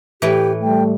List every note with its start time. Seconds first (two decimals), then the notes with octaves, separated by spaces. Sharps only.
0.22 A2 E3 G4
0.63 G3 A3 G5